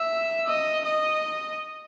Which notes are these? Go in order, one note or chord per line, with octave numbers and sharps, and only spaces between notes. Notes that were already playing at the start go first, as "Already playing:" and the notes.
Already playing: E5
D#5
D#5